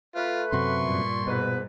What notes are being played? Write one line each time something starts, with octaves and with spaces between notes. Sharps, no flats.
A3 F4 B4
F#2 C3 F#3 C6 C#6
G2 A#2
G#2 B2 B4